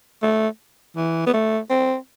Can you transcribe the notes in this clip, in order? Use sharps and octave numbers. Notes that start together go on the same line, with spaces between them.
A3
E3
B3
A3
C4